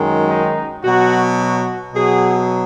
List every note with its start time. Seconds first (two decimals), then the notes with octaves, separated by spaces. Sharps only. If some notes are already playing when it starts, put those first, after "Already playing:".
Already playing: F#2 D#3 G#3
0.28 D#4
0.82 B2 F#3 F#4
1.38 F#4
1.94 B2 F#3 G#4